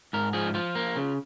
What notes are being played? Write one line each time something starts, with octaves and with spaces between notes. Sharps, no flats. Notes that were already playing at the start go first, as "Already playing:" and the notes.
G#2 A#4
F3 G#4
F3 F4
A#3
C#3